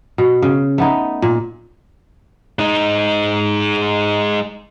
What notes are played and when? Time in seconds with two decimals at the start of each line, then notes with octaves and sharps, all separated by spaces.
0.18 B2
0.42 C#3
0.78 A3 B3 D#4
1.22 A#2
2.59 G#3 D#4